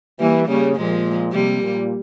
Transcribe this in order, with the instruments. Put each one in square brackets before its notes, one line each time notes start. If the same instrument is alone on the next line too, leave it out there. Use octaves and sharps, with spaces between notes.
[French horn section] E3 [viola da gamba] G3 A#3
[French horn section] C#3 [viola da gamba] G3 A#3
[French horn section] A#2 [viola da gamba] F3 G#3
[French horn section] C3 [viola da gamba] G3 A#3
[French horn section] A#2